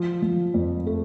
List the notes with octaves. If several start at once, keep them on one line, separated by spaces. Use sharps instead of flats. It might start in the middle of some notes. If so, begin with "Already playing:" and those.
Already playing: F3
F3
F2
A3